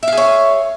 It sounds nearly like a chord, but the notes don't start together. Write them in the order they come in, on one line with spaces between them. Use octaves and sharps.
E5 F5 G#4 C#5